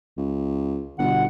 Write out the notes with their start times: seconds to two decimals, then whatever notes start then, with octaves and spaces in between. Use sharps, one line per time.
0.17 C#2
0.98 G1 B2 D3 F#5